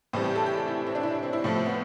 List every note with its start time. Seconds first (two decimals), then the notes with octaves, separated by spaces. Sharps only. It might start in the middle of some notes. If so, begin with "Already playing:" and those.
0.13 A2 E3 G3 C4
0.24 G4
0.36 A4
0.46 G4
0.57 A4
0.68 E4
0.87 C4
0.95 D4
1.03 E4
1.11 D4
1.23 C4
1.33 E4
1.44 A2 F3 A3
1.55 C4
1.66 B3